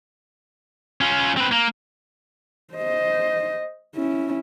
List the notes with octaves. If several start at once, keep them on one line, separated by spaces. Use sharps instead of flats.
C#4 F4
C4 B4
A#3
C5 D#5
C#4 E4